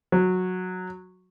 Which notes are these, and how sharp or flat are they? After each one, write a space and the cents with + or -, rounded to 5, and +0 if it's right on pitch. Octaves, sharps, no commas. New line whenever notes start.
F#3 -10